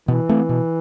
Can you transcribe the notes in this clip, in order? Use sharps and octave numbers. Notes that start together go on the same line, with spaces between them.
B2 E3
A3 C4
B2